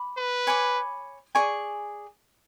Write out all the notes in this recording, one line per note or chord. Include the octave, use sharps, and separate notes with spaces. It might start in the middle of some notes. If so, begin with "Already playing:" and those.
Already playing: B5 D6
B4
C#5 G#5 B5 D6
G#4 D5 G#5 C#6